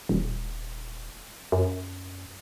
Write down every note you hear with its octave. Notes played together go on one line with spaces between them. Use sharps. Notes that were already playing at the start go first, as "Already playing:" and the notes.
D#1
F#2